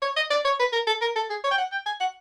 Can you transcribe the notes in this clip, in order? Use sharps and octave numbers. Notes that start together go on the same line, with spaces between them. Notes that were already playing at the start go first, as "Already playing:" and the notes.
C#5
D#5
D5
C#5
B4
A#4
A4
A#4
A4
G#4
C#5
G5
F#5
G5
G#5
F#5